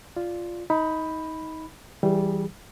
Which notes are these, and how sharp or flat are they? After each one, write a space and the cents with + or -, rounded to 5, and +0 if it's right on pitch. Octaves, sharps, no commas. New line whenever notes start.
F4 +0 D5 +0
D#4 +25 B5 +0
E3 -5 G3 -10 G#4 -30